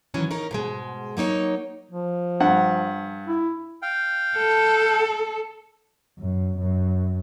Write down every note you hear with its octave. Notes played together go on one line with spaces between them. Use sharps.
D#3 E3 F#3 C#4
C#4 D#4 A#4
G#2 B2 G#3
F#3 A#3 D#4 C#5
F3
G2 F#5
E4
F5 G5
A4
F#2
F#2